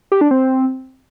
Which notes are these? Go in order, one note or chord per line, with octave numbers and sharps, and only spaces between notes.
G4
D4
C4